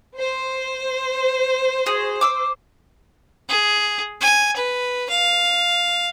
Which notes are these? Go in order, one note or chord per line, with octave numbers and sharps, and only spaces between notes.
C5
F#4 G#4
D6 E6
G#4
G#5
B4
F5